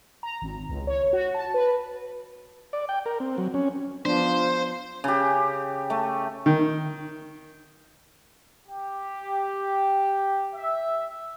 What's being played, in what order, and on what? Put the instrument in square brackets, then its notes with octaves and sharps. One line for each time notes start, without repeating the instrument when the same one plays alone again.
[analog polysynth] A#5
G#1
C#2
C#5
F#4
A5
B4
[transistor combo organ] D5
G5
A#4
C4
F#3
C#4
[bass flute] F3 [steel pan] B3 D4 [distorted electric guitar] C5
[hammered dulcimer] C#3 G4
A3
[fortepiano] D#3
[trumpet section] G4
E5